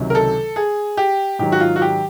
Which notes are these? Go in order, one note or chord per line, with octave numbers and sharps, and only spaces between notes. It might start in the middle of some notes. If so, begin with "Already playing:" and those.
Already playing: C#2 C3 D#3 F#3
A#4
A4
G#4
G4
G#2 D#3 F#3 G4
F#4
F4
F#4
G4